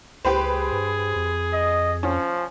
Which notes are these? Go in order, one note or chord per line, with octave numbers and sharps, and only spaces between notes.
C#2 G4 G#4 B4 C5
G2
F2
D#5
F3 C#4